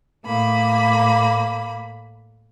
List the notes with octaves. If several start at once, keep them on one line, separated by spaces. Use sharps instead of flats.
A2 A#3 B5